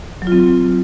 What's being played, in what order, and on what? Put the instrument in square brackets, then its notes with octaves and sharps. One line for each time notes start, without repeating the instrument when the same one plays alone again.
[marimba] F#3
F4
C4